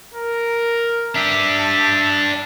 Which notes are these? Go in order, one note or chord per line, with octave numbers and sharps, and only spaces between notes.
A#4
D4 G4 E5
A5